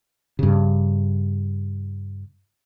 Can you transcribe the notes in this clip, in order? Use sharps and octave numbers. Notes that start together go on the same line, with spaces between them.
G2 C#3